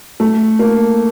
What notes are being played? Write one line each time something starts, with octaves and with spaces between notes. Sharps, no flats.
A3
A#3